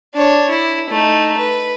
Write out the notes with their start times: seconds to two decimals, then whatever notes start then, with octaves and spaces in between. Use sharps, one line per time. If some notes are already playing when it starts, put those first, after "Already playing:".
0.15 D4 C#5
0.49 E4
0.90 A3 D#4
1.38 B4